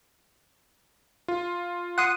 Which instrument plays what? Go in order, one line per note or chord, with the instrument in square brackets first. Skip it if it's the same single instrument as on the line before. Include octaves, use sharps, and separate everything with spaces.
[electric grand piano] F4
[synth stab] F#5 C6 D#6